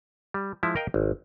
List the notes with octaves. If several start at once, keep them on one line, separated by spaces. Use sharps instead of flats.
G3
F3 G#3 E4
A#4 D#5 F5 G5
G#1